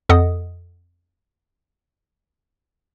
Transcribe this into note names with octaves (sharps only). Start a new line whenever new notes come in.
F2 A4 D#5 F#5 D#6